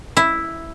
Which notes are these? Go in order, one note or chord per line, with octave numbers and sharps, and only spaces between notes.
E4